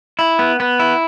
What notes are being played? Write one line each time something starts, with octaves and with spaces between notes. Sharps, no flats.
E4
B3
B3
E4